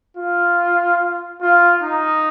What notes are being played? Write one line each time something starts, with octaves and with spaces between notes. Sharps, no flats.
F4
F4
D#4